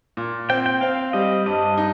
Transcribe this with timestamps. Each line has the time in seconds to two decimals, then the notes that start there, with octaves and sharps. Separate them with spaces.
0.17 A#2
0.49 C4 G5
0.66 G5
0.81 C4 F5
1.13 G3 D#5
1.46 G2 D#5
1.77 D#4